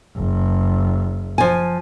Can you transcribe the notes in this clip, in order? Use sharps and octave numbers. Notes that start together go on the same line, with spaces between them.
F#1
F3 G#5